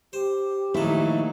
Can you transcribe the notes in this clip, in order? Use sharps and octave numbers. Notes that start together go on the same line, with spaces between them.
G4 C5
A#1 D#2 F#3 A3 D#4 E4 A4